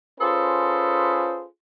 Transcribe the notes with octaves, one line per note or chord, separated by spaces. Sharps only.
C#4 F4 G#4 A4 B4 C5